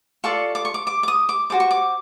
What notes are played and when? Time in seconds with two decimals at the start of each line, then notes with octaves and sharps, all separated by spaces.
0.24 F4 A4 D5 C#6
0.55 D6
0.65 C#6
0.74 D6
0.87 D6
1.03 D6
1.08 D#6
1.29 D6
1.50 F#4 A4 C5 D6
1.60 C#6
1.71 D6